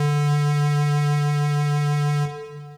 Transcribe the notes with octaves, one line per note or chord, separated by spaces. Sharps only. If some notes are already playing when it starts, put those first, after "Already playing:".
Already playing: D3